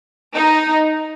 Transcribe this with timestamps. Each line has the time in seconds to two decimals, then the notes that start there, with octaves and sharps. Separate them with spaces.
0.35 D#4